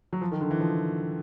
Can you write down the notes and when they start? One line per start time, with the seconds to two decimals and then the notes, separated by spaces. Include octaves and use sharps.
0.13 F#3
0.21 F3
0.32 D#3
0.41 D3
0.51 E3
0.60 F3